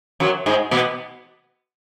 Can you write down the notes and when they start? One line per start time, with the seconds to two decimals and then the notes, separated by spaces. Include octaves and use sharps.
0.20 F#2 F#3
0.46 G#2 G#3
0.71 B2 B3